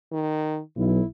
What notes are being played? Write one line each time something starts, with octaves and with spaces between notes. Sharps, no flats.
D#3
B1 E4